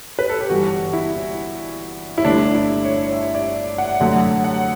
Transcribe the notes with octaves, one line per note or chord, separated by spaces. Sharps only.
B4
A4
G4
G1 G2 E3 G3 F#4
E4
E4
G1 G2 D3 A3 D4
E4
C#5
E5
D5
F#5
F#2 D3 F#3 A3 F#5
F#5